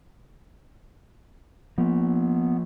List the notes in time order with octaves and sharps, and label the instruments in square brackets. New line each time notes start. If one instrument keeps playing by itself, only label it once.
[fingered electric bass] F3 A#3 [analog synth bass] B3